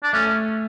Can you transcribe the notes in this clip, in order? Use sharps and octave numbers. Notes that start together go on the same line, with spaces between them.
D4
A3 C#4